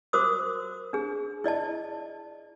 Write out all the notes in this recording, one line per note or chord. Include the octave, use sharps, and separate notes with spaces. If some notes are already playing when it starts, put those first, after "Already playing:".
F#4 A#4 C5 C6 D6 D#6
D4 G#4
E4 D5 D#5 A5